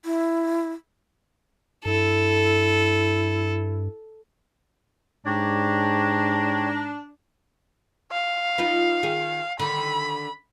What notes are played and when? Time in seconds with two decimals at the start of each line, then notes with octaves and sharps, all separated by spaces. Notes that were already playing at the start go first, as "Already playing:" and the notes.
0.05 E4
1.85 G2 E4 A4
5.26 G#2 D4 G4 C#5 A#5
8.12 F5
8.58 D#4 F4 B4
9.03 D#3 G#4
9.60 D3 D#3 B5